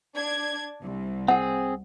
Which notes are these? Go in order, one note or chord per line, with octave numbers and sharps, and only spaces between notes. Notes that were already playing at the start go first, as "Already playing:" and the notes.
D4 G#6
C2
C4 G#4 F#5